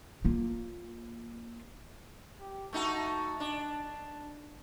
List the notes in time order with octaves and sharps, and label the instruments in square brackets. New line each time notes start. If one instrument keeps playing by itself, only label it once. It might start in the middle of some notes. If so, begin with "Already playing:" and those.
[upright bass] A#3 F4
[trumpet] G4
[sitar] A3 D#4 F#4 [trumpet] A5
[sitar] D4